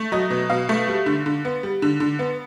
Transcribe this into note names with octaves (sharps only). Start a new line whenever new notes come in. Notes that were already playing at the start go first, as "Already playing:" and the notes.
Already playing: A3
F#3 D#5
B2
B2 F5
A3
G3
D3
D3
B3
G3
D3
D3
B3